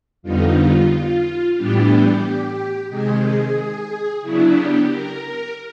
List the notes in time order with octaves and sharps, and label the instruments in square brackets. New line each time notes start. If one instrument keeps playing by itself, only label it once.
[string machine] F2 D3 G3 B3 D#4 F4
F4
A2 E3 G3 B3 D4 G4
C3 D#3 G#3 G#4
C#3 F#3 B3 D4 E4
G4
A#4